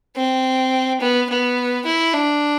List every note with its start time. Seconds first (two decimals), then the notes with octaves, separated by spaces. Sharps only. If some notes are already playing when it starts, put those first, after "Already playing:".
0.16 C4
1.00 B3
1.29 B3
1.86 E4
2.13 D4